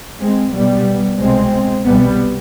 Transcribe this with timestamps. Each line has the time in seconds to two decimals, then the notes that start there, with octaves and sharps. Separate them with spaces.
0.21 G#3 C4
0.54 B1 B2 G3 B3
1.20 C2 B2 G#3 C4
1.87 C2 B2 G3 B3